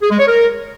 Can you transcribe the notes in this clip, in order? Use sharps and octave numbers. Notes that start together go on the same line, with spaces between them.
G#4
G#3
C#5
A#4